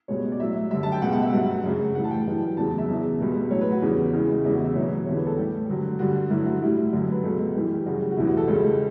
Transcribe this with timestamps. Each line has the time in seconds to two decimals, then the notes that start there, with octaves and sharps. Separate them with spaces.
0.08 C#2 B2 G3 C#5
0.32 D5
0.40 A2 F#3 E5
0.71 F#2 D3 G3 E5
0.83 A5
0.92 G5
1.02 C#2 B2 G3 F#5
1.12 F#5
1.23 E5
1.33 G2 F#3 F#5
1.64 F#2 C#3 F#3
1.95 A2 E3 G3 F#5
2.04 A5
2.11 G5
2.26 F#2 E3 G3
2.57 E2 C#3 F#3 A5
2.67 A5
2.78 E5
2.88 E2 C#3 F#3
3.20 C#2 B2 G3
3.50 A2 F#3 C#5
3.61 B4
3.71 F#4
3.82 E2 C#3 G3
4.13 C#2 C#3 E3
4.44 E2 C#3 G3 E4
4.54 F#4
4.65 E5
4.75 E2 B2 F#3 C#5
5.06 E2 D3 G3 C#5
5.16 B4
5.27 A4
5.37 A2 G3 G4
5.68 G2 D3 F#3
5.99 G2 D3 G3 F#4
6.30 G2 D3 F#3 E4
6.45 F#4
6.62 A2 G3 E4
6.93 F#2 D3 F#3
7.11 B4
7.24 C#2 B2 F#3 A4
7.55 G2 E3 G3 G4
7.74 G4
7.86 F#2 C#3 G3 F#4
8.11 F#4
8.17 E2 B2 G3 E4
8.27 F#4
8.37 A4
8.48 C#2 C#3 G3